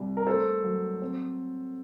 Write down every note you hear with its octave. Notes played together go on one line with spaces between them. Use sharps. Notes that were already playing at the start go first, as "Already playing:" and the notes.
Already playing: C2 G3
A#4
A3 A4 C5
F#3
C4